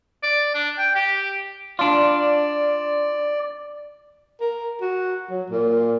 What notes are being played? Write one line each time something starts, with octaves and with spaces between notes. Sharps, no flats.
D5
D4
G5
G4
D4 F4 D5
A#4
F#4
F#3
A#2